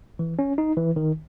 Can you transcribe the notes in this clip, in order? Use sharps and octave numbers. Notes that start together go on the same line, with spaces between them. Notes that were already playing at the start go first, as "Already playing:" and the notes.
E3
C#4
D#4
E3
D#3